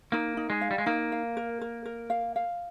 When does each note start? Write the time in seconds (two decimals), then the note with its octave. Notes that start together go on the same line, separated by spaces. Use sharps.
0.12 A#3 D#4
0.37 D#4
0.50 G#3
0.61 F5
0.71 G3
0.78 G#3
0.86 A#3 D#4
1.12 F5
1.37 A#4
1.61 A#4
1.86 A#4
2.10 F5
2.36 F5